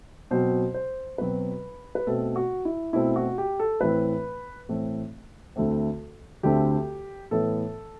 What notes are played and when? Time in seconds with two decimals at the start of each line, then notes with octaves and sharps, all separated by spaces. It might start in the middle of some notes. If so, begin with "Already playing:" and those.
0.31 B2 F#3 C4 C5
0.74 C5
1.18 B2 F#3 C4 B4
1.95 B4
2.07 B2 A3 C4 A4
2.36 F#4
2.65 E4
2.93 B2 A3 C4 E4
3.16 F#4
3.38 G4
3.60 A4
3.81 A2 E3 A3 C4 B4
4.69 A2 E3 A3 C4
5.56 D2 D3 A3 C4
6.43 D2 D3 A3 C4 G4
7.31 A2 E3 B3 A4